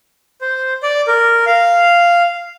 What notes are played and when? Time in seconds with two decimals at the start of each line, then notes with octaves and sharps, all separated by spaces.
0.41 C5
0.83 D5
1.07 A#4
1.47 F5